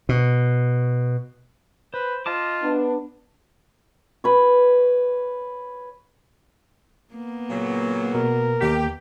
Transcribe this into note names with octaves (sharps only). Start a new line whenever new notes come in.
B2
B4 C5
F4 D#5 A5 D6
B3 D4
B4 C#5
A#3 B3
A#2 C#3 F#3
B2 A#4
D#2 G4 B6